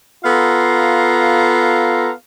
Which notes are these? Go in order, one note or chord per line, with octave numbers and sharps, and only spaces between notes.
B3 F4 A4 F5 A#5 C6